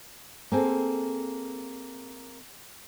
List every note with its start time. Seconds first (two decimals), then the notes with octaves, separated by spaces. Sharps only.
0.52 A#3 C4 G#4 A4